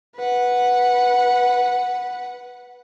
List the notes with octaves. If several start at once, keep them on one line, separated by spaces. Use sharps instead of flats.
B4 F#5